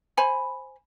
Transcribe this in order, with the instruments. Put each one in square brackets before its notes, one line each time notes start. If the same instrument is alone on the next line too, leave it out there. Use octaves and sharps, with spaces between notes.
[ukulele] C5 G#5 B5